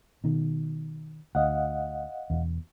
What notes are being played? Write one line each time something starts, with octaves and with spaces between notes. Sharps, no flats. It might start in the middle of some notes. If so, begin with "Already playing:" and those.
B2 D#3
D2 D#5 F5 F#5
E1 E2